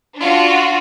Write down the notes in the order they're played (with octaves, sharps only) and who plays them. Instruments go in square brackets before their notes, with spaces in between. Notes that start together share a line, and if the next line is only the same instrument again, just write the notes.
[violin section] D4 F4 F#4